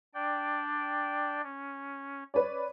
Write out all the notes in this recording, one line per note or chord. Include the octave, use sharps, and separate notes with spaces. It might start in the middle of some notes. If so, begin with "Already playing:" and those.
D4 D5 G5
C#4
B4 C#5 D5